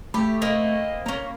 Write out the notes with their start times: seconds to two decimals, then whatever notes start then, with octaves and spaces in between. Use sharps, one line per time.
0.14 A3 G4 B5
0.42 A#3 C4 D#5
1.06 A#3 C#4 A#5